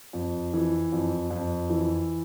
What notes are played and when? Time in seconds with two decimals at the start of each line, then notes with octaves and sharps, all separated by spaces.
0.13 F2
0.54 E3
0.92 F2
1.30 F2
1.70 E3